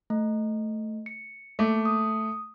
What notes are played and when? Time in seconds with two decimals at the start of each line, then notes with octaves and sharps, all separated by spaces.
0.10 A3
1.06 C#7
1.59 A3 A#3 D6
1.85 D#6